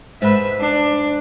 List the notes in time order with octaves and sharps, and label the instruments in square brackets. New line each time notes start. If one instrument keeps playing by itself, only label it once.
[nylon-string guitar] G#2 [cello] B4 E5
[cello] D4